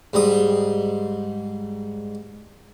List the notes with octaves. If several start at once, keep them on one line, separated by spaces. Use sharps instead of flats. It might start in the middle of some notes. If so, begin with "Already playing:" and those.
G#2 G3 D#6